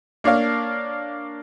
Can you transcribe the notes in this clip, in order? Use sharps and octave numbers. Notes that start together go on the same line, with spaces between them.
A#3 D4 C#5 F5